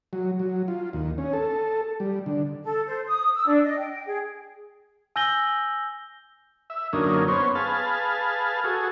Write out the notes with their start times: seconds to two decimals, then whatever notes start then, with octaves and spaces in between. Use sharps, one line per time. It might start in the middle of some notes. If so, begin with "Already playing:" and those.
0.13 F#3
0.39 F#3
0.68 F4
0.93 D#2
1.18 C#4
1.33 A4
2.00 G3
2.26 D3
2.64 A4
2.86 C5
3.07 D#6
3.35 E6
3.46 D4
3.63 D#5
3.77 G5
3.90 G5
4.05 G#4
5.16 G#5 E6 G6 A#6 F#7 G7
6.70 E5
6.93 F#2 D3 A#3 C#4 D#4
7.28 B3 C#4 C5 C#5
7.55 G#4 B4 F5 A5
8.64 F#4 G#4 A4